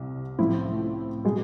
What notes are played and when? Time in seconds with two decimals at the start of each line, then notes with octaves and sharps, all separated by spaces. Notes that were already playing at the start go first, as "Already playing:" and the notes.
Already playing: C2 G3
0.39 A2 F3 A3 C4 E4
1.25 B2 G#3